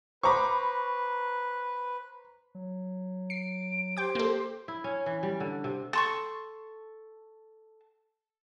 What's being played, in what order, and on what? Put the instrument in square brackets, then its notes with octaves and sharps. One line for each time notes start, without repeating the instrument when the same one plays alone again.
[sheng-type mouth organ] B4 [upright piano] C5 A#5 B5 [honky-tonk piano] C#6 D6
[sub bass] F#3
[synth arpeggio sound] C7 [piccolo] D7
[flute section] G4 C5 C6 [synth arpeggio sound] G5 D6
[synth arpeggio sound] A#3 A4
[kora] E4
C#4
E3
G3
D3
C3
[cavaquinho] A4 C6 C#6